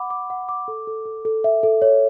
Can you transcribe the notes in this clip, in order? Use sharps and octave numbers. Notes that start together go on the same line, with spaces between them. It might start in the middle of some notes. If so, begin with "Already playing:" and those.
Already playing: F#5 B5 D6
D6
F#5
D6
A4
A4
A4
A4
E5
A4
C#5